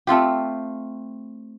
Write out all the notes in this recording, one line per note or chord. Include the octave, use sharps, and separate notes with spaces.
A3 C4 F4 G4